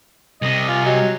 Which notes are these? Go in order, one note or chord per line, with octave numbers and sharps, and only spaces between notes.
C2 C3 D#5
F4 G#5
F#3 G3 G4 D#5